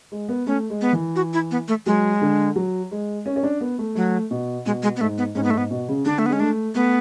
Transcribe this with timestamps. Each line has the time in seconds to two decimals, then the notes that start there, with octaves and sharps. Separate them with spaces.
0.12 G#3
0.29 B3
0.47 A3 C#4
0.70 G#3
0.81 B3
0.93 E3
1.16 F#4
1.34 E4
1.51 B3
1.68 A3
1.86 F#3 G#3
2.22 D3
2.56 F#3
2.91 G#3
3.26 C#4
3.36 C#4
3.43 D4
3.61 B3
3.78 A3
3.95 F#3 A3
4.31 B2
4.66 B2 G#3
4.83 G#3
4.96 B3
5.00 G#2 A3
5.18 B3
5.35 G#2 C#4
5.44 B3
5.50 G#2 A3
5.58 B3
5.71 B2
5.88 C#3
6.05 D3 D4
6.19 A3
6.26 B3
6.30 G#3 C#4
6.40 A3 D4
6.75 A3 B3